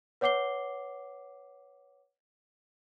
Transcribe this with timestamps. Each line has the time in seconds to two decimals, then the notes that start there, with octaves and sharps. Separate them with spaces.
0.21 B4 C#5 F#5 D6 C7 G7